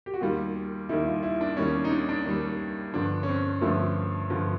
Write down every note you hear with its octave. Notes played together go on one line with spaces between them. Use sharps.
G4
F#4
D#2 D#3 G3 F4
D#2 D#3 G3 E4
F4
E4
D4
D#2 D#3 G3 C#4
D#4
D4
D4
D#2 D#3 G3
G2 D3 F3 D4
C#4
C4
G2 D3 F3 A3
G2 D3 F3